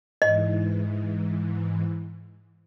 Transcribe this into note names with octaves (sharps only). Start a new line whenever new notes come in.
G#2 E3 D#5